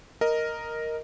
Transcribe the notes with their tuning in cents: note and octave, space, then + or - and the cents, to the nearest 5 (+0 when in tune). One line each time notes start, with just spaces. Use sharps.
A#4 +0 D#5 +0